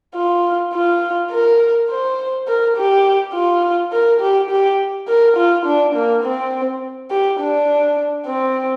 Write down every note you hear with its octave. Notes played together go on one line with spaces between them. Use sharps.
F4
F4
A#4
C5
A#4
G4
F4
A#4
G4
G4
A#4
F4
D4
A#3
C4
G4
D4
C4